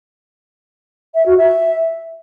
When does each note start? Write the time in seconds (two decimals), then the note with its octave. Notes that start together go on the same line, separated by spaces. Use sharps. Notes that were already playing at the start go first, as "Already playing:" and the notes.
1.14 E5
1.26 F#4
1.37 E5